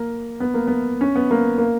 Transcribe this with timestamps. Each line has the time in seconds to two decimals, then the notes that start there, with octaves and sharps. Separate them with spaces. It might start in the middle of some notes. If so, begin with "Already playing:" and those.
Already playing: A#3
0.40 B3
0.54 A#3
0.67 B3
1.01 C#4
1.16 B3
1.31 A#3
1.58 A#3